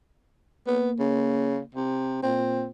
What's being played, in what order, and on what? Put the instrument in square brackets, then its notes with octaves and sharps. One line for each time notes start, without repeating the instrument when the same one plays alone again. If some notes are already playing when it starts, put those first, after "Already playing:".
[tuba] A#3 [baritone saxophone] B3
[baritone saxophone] C#3
C3
[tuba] A#2 [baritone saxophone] C4